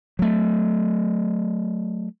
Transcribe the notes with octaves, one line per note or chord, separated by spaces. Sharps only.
F#3 A3